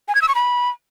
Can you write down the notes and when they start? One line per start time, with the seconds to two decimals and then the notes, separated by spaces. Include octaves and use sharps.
0.08 G#5
0.15 G#6
0.22 E6
0.28 C#6
0.35 B5